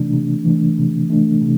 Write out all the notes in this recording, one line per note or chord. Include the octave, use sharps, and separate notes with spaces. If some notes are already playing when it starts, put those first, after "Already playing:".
Already playing: C3 E3 A3 D4
C3
E3 A3 D4
C3
E3 A3 D4
C3